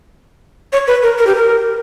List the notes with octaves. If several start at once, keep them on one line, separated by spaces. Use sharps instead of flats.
C#5
B4
A#4
A#4
G4
A#4